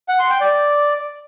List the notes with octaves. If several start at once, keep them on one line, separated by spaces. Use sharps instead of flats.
F#5
C6
G5
D5